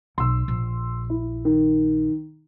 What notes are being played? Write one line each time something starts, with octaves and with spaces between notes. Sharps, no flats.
B1 C6 E6
A#1
E4
D#3